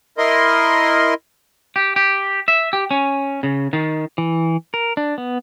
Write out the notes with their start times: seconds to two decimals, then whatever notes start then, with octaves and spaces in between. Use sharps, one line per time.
0.18 E4 A#4 D#5 C6
1.76 G4
1.96 G4
2.48 E5
2.73 G4
2.91 C#4
3.43 C#3
3.73 D#3
4.18 E3
4.74 A#4
4.97 D4
5.18 B3